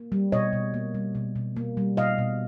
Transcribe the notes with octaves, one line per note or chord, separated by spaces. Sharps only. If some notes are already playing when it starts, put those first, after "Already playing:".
Already playing: A#3
G3
B2 C#5 D#5
B2
A#3
G3
B2
B2
A#3
G3
B2 D#5 F5
B2